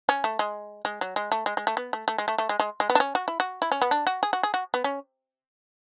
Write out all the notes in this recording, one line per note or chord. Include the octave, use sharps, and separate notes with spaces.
C#4
A3
G#3
G#3
F#3
G#3
A3
G#3
G#3
A3
B3
A3
A3
G#3
A3
A3
G#3
G#3
G#3
B3
D4
C#4
F#4
E4
F#4
E4
C#4
B3
D4
F#4
G#4
F#4
G#4
F#4
B3
C#4